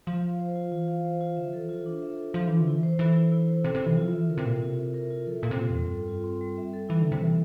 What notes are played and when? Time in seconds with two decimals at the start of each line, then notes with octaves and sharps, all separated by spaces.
0.07 F3 F4
0.24 F5
0.39 C5
0.56 F4
0.72 E3 F4
0.88 F5
1.05 C5
1.21 F4
1.37 D3 E5
1.48 F3
1.53 E3 A4
1.69 F3 F4
1.80 E3
1.86 D4
2.02 E5
2.18 A4
2.34 F3 F4
2.47 E3 D4
2.61 D3
2.67 E4
2.73 E3
2.83 C5
2.99 E3 A4
3.16 E4
3.32 E4
3.48 C5
3.64 C3 A4
3.75 C3
3.80 E4
3.86 E3
3.97 F3 F4
4.13 E3 E5
4.29 D3 A#4
4.38 C3
4.45 A#2 F4
4.53 C3
4.62 F4
4.79 E5
4.94 A#4
5.10 F4
5.27 F3 A4
5.43 A#2 F4
5.51 C3
5.60 A#2 C4
5.70 E2 G3
5.81 F2
5.92 G2 A4
6.08 F4
6.24 C4
6.41 G3
6.58 E5
6.73 A4
6.89 E3 E4
7.01 D3
7.06 A#3
7.12 C3
7.22 E3 E5